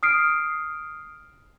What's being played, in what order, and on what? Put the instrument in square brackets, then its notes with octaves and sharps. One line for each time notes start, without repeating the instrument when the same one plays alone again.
[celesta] D#6 F6 C7 D7